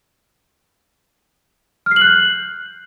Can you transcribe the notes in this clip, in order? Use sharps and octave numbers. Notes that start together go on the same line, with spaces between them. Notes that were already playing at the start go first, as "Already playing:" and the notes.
F6
C7
F#7
F#6
G6